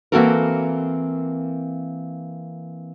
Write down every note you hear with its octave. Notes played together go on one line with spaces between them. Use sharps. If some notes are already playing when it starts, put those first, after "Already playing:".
E3 A#3 C4 F#4 A4 A#4